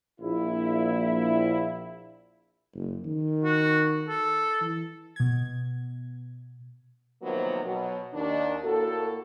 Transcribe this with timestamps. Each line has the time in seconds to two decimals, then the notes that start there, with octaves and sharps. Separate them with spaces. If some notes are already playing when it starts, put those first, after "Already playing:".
0.20 A#1 E4
2.75 F#1
3.05 D#3
3.44 F#4
4.08 A4
4.61 E3
5.16 B2 G#6
7.23 C3 D#3 F3 F#3 A#3 B3
7.65 B2 F#3
8.14 D#2 D#3 D4
8.64 A2 A#3 F#4 A4